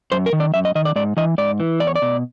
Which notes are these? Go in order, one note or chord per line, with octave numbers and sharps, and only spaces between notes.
F#2 C5
A#4
D#3
D5
F#2 E5
D#5
D#3 D#5
D5
G#2 D5
E3 D#5
G#2 D5
E3
E2 D5
C#5
D5
B2